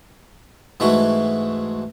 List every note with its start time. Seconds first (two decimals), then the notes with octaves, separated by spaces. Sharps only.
0.80 G#2 E3 G#3 A3 F#4